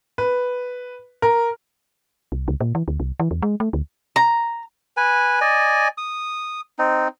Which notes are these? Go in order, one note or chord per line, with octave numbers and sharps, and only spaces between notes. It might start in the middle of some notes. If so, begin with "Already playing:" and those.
B4
A#4
C2
C#2
A#2
E3
D2
C2
E3
E2
G#3
A3
D2
A#5
B4 G#5
D5 D#5 G#5
D#6
C4 D#4